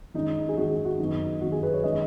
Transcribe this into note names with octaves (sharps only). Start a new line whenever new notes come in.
D#3 G#3 C#4 D#4
G#4
D#3 G#3 C#4 F#4
G#4
F#4
F#2 D#3 B3 D#4
F#2 D#3 B3 F#4
G#4
B4
C#5
D#3 G#3 C#4 D#5